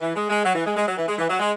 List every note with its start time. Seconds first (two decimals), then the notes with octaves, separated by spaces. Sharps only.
0.01 E3
0.16 G#3
0.30 G#3
0.43 F#3
0.54 E3
0.65 G#3
0.76 G#3
0.87 F#3
0.97 E3
1.07 G#3
1.18 E3
1.29 F#3
1.40 G#3